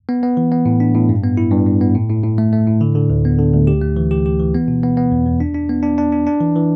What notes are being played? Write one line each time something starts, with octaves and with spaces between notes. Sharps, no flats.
B3
B3
E3
B3
A2
D4
A2
G2
B3
E4
G2
G2
B3
A2
A2
A2
A3
A3
A2
D3
D3
D2
B3
D3
D2
G4
A3
E3
G4
G4
E3
B3
B2
B3
B3
E2
E2
D4
D4
B3
D4
D4
D4
D4
E3
E3